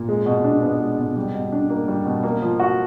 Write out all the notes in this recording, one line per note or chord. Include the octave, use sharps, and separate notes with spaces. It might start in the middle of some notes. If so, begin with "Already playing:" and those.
Already playing: A#2
G#3
B2
D4
B3
G#3
B2
G3
B2
D4
A#3
G3
B2
A#3
F3
F#4